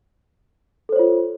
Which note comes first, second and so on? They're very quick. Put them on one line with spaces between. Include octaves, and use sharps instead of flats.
A4 C5 C#5 F4